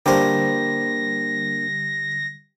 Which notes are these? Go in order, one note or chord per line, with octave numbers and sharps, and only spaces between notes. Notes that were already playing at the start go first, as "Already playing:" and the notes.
D3 G3 A#3 D4 G4 A#4 C5 A#6